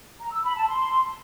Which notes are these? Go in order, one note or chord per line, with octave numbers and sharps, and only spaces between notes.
A#5
E6
B5
A5
C6